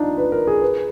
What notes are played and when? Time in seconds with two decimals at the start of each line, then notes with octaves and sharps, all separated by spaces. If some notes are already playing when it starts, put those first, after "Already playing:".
Already playing: D4 D#4 F4
0.18 B4
0.32 A#4
0.47 G#4
0.62 B4